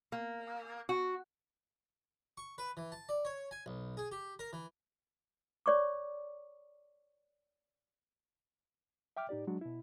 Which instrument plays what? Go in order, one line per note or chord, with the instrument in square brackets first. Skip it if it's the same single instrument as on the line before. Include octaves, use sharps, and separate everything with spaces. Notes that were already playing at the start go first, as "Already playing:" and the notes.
[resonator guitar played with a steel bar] A#3
F#4
[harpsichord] C#6
B4
E3
A5
D5
C#5
G#5
B1
G#4
G4
A#4
E3
[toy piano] C#5 D5 C#6 D6
[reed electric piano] E5 G5 D6 F6
A2 D#4 G4 D5
F#3 G#3 D4 F#4
B2 E4